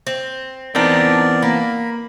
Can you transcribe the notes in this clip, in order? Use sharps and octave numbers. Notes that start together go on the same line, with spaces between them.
C4
E3 B3 C4 D4 D#4 A#4 D5
A#3 B5